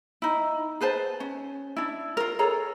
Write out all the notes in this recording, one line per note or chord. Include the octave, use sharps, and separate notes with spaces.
D#4 E4
G#4 B4 C5 A5
C#4
D4 E4
F4 A#4
G#4 A4 C#5 A#5